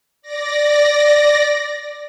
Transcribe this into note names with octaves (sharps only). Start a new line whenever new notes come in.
D5 A#6